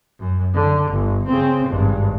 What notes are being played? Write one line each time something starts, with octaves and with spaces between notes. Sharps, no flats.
F#2
D3
G1
C#3 C4
G#1 G2